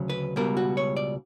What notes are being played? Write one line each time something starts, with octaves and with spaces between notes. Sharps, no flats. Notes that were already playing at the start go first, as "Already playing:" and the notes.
Already playing: D2 C#3 F#3
B4
C#2 B2 G3 A#4
F#4
C#5
D5